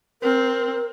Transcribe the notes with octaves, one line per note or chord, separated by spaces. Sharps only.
C4 A#4